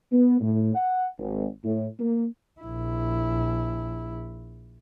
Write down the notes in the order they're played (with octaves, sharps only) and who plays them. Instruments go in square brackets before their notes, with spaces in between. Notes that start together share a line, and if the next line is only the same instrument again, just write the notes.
[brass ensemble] B3
A2
F#5
G#1
A2
A#3
[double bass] A#1 E4